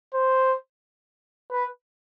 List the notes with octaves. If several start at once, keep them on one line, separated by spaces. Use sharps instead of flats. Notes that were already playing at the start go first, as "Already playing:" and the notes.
C5
B4